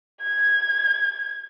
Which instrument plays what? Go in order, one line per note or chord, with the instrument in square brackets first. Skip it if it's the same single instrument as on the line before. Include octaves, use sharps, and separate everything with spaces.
[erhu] G#6